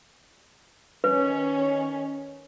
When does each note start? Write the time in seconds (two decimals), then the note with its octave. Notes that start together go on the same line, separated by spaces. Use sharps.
1.04 D#3 C#4 B4